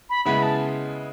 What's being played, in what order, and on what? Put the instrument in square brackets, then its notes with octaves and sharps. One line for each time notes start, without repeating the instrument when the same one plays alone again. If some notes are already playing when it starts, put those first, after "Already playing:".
[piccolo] B5
[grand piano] C#3 G#3 B3 E4 [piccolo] B5
[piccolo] A5